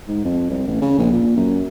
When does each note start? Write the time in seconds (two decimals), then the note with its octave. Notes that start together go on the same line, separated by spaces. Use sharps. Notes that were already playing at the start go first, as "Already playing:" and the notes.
0.08 G#2
0.25 F2
0.50 C2
0.67 A1
0.82 C#3
0.98 A#1
1.13 A#2
1.37 F#2